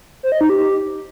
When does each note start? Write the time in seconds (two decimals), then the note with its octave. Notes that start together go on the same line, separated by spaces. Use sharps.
0.23 C5
0.32 D#5
0.41 D#4
0.50 G4